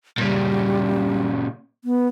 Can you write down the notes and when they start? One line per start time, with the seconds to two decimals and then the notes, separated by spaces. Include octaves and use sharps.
0.18 A#2 C#3 G3
1.85 B3